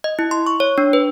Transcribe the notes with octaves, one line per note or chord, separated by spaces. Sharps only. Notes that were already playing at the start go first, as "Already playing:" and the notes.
D#5
E4
C6
C#6
C#5
D4
B4